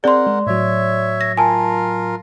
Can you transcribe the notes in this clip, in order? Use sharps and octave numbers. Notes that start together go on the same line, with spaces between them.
C4 G#4 A#4 D5 F#5 C6
G#3
A2 F#3 C#5 E5
A#6
F4 A#4 G#5 A5